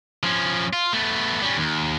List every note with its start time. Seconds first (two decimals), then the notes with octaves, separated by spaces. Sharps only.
0.23 F3 C#4
0.73 F4
0.93 A3 B3
1.42 G3 C#4
1.57 D#2